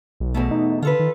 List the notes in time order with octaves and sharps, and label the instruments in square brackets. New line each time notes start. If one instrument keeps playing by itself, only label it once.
[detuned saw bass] B1
[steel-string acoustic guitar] E2 B2 A3
[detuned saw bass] D#4
[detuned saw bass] D3 [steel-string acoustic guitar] F4 A4 B4
[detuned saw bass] D#3